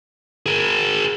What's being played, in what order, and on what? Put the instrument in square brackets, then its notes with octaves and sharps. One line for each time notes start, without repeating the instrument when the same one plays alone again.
[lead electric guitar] G#4 A#4